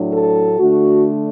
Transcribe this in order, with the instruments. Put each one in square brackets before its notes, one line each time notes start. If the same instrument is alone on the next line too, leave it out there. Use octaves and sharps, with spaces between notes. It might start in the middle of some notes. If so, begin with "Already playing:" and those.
Already playing: [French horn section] A2 F#3 A3 D4
A4
D3 A3 D4 F#4